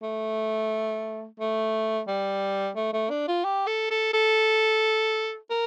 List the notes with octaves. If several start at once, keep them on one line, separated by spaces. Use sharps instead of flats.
A3
A3
G3
A3
A3
D4
F4
G4
A4
A4
A4
A#4